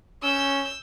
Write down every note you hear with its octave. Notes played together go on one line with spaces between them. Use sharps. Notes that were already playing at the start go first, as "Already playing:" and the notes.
C#4 E6 G6